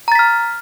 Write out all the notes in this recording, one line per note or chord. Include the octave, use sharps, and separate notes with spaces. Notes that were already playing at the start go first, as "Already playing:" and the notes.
A#5 F6 A6 B6